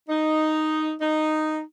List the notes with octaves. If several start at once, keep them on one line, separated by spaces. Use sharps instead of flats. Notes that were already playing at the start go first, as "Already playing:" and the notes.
D#4
D#4